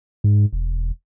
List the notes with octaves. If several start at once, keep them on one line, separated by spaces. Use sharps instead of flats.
G#2
E1